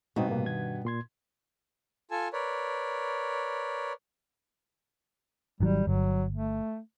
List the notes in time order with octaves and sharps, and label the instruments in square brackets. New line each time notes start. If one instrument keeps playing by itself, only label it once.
[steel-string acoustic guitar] G2 B2 B3 [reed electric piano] C4 D#4 F#4
[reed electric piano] A2 C3 A#3
D#3 G#6
A#2 C6 G#6
[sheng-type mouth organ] F4 A4 G#5 A5
A#4 B4 C#5 D5
[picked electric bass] G#1 D#3 F#3 [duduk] G3
[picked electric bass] G1 [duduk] F#3
[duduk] A3